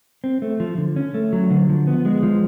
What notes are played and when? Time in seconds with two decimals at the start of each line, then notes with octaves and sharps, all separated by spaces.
0.24 C4
0.42 A3
0.60 F3
0.78 D3
0.96 C#4
1.14 A3
1.33 F#3
1.51 D3
1.69 F3
1.87 B3
2.05 G#3
2.23 F3